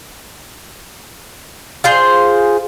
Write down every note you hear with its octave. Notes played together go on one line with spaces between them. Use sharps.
F4 G#4 C5